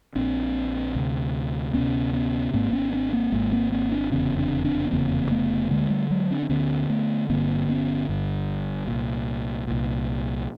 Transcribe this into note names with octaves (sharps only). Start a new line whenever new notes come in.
A#1 A#2 C4 D4
D2 C3
D2 C3 B3 C#4
B3 C#4
G#1 G#2 A#3 C4
B3 C#4
C4 D4
A#3 C4
G#1 G#2 G#3 A#3
A#3 C4
A#3 C4
C4 D4
F1 E2 C#3 B3 C#4
C4 D4
C4 D4
B3
F1 E2 C#3 A#3 C4
A3 B3
D2 D3 G#3 A#3
G3 A3
F#3 G#3
C4 D4
C4
D2 D3 B3 C#4
A3 B3
G1 G2 D3 A#3 C4
B3 C#4
G1 G2 D3
C2 A#2
C2 A#2